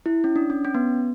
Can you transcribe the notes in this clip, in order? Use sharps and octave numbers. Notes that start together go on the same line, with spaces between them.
E4
C#4
D4
C#4
C#4
B3